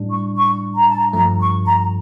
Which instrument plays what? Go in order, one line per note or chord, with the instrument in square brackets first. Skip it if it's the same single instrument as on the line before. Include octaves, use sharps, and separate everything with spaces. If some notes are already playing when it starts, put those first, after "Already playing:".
Already playing: [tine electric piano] A2 G3 D4
[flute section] C#6
C#6
A#5
A5
A#5
[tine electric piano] G2 F3 A3 [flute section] A#5
[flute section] C#6
A#5